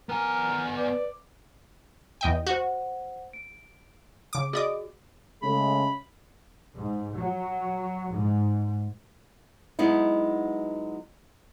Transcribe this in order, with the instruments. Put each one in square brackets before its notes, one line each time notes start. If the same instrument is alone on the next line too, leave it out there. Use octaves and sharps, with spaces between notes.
[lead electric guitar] B3 G#5 [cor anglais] A#4
[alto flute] B4 [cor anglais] D5
[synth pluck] E2 D#5 G5
[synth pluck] F#4 [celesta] C5 F#5
[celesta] D7
[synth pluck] C#3 D6
[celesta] F#4 G#4 [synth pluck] D5 D#5 D6
[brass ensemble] C#3 G#3 A3 [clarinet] B5
[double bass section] G#2
F#3
G#2
[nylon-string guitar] F#3 G#3 B3 D#4 E4